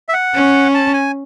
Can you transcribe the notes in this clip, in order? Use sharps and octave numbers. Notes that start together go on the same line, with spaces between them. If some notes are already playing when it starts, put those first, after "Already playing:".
E5
F#5
C#4
A5
G#5